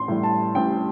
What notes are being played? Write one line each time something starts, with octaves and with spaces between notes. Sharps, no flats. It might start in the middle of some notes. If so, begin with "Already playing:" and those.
Already playing: A1 C6
A2 G3
A5
A1 G5